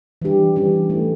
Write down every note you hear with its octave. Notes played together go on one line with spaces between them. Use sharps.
E3 G3 D4 G4
E3 G3 C#4 G4
A3 E4 A4